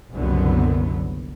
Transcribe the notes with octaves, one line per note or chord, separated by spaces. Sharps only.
F#1 C2 F#2 D3 F#3 B3